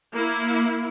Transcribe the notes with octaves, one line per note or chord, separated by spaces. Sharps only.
A#3 E4